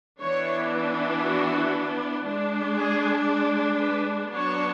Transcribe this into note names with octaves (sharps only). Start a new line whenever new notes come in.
E3 B3 D4 C#5
F#4
G#3 D4
G#4
B4
F#3 B3 D4 C#5